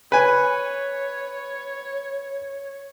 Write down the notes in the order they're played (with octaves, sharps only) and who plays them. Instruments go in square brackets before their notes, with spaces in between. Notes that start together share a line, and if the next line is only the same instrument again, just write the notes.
[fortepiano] B4 G#5 [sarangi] C#5